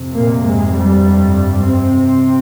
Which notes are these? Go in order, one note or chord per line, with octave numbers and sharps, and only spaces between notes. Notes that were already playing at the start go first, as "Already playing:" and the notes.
Already playing: F2 C3
A#2 A#3
G#2 G#3
G2 G3
C3 C4